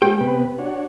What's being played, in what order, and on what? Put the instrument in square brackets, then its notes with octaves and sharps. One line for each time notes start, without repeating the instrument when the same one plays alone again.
[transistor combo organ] G#3 [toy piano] G4 [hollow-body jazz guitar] G5
[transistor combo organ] C3 B3 B4
D4 F#4 C#5